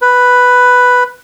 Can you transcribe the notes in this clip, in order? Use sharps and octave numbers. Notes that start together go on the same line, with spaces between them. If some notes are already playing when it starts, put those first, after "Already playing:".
B4